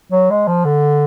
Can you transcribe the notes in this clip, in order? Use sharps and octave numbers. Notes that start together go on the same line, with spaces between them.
F#3
G#3
F3
D3